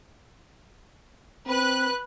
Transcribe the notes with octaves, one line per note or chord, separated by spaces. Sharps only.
C4 B4 F#6